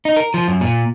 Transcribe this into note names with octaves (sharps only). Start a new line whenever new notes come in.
D#4
A#4
F3
F#2
A#2